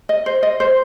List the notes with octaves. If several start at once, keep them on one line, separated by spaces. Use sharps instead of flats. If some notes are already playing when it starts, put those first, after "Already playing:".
D#5
C5
D#5
C5